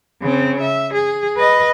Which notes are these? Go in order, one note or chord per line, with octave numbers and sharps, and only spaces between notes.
C#3 C4
E5
G#4
B4 D#5